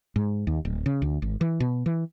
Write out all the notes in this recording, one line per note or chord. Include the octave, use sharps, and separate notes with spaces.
G#2
D#2
D1
C#3
D2
G#1
E3
B2
E3